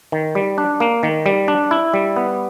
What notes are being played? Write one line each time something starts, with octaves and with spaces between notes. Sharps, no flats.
D#3
G3
D4
A#3
D#3
G3
D4
E4
G3
B3